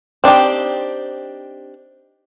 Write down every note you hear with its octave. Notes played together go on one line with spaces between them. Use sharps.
C4 D4 D#4 G4